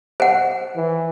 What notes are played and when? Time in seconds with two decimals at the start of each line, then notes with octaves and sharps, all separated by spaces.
0.20 C5 F#5
0.76 E3